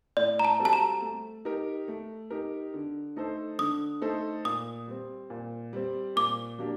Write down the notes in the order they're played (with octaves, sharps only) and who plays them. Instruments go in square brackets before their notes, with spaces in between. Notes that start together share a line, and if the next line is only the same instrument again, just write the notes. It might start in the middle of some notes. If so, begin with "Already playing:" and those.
[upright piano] A2 [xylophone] D5
[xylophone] A#5
A5
[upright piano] G3 C4 F#4 A4
[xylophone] A5
A#5
[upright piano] A3
D#4 G4 A#4
A3
D#4 G4 A#4
D3
A3 D#4 A4 C5
[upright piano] D3 [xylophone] D#6
[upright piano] A3 D#4 A4 C5
[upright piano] A#2 [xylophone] D#6
[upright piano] G3 C4
A#2
G3 C4
[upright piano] A#2 [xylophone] D6
[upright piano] F#3 A#3 D4 G4